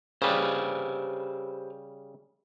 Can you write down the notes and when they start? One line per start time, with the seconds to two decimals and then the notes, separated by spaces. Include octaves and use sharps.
0.22 C#3 G3 G4 B4 C5